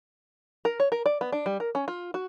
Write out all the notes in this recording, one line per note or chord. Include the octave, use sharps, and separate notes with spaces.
A#4
C#5
A#4
D5
B3
D4
G3
A#4
C#4
F4
F#4